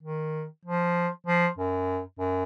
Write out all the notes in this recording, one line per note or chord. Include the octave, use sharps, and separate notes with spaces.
D#3
F3
F3
F#2
F#2